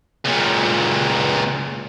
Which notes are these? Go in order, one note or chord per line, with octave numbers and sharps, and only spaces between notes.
C#2 A#2